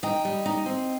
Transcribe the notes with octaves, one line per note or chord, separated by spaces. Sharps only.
D#4 D#5 G5
G3
D#4
C4